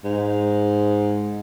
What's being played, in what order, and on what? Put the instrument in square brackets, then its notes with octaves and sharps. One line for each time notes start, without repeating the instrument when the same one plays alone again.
[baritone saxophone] G#2